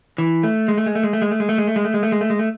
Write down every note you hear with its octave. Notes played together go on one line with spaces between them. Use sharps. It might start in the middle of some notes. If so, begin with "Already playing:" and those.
E3
A3
G#3
A3
G#3
A3
G#3
A3
G#3
A3
G#3
A3
G#3
A3
G#3
A3
G#3
A3
G#3
A3
G#3
A3